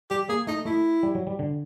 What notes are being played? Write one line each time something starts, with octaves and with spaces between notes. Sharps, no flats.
G3 G4
A#3 G#4
A3 D#4
A3 E4
G3
F#3
G3
D3